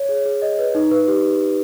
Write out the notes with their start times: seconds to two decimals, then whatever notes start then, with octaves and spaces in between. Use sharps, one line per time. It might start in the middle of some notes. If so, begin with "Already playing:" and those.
Already playing: C#5
0.09 G#4
0.26 G#4
0.42 D#5
0.59 B4
0.75 D#4
0.91 B4
1.08 G4